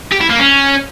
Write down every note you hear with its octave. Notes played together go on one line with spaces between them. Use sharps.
G4
E4
A#3
C#4